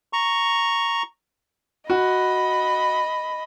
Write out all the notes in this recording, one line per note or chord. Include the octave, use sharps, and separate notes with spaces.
A#5 C#6
F#4 D#5 B5